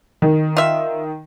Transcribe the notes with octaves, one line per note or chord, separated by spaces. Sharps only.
D#3
F4 E5